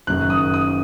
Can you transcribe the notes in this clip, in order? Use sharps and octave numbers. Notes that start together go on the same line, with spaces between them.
F#1 F#2 D#3 F#6
D#6
D#6